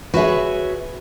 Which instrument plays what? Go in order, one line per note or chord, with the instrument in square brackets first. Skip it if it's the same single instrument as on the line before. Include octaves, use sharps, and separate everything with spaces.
[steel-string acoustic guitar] F#4 C#5 E5 [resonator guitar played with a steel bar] G#4 B4